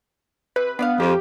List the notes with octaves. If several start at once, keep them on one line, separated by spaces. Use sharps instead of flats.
C3 B4
B3 D4 D5 F5
F2 F3 F4 G4